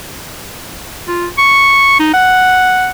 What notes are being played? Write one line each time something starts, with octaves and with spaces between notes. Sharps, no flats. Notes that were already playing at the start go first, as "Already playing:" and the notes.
F4
C#6
D#4
F#5